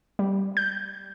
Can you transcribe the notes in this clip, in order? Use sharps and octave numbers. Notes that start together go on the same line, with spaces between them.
G3
G6